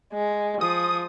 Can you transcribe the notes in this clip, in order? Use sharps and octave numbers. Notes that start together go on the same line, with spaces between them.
G#3
F3 D#6